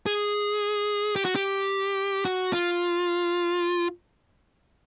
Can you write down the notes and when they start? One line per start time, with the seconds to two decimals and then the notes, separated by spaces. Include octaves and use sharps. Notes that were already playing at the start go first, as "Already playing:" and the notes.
0.06 G#4
1.16 G4
1.25 F#4
1.36 G4
2.25 F#4
2.53 F4